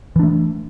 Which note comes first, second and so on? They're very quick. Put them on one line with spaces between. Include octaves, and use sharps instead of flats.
E3 D4 A3